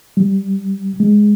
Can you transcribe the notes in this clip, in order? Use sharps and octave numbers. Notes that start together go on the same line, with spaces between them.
G3
G#3